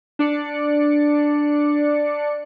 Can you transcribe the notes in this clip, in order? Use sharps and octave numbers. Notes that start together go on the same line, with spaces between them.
D4 D5 C#7